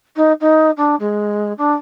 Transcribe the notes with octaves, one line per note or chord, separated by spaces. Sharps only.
D#4
D#4
D4
G#3
D4